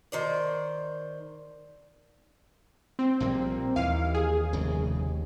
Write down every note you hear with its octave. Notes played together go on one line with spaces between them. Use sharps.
D#3 C5 D5
C4
A#1 A#2 G3 A#3
D#2 E3 F5
G#4
F1 C#3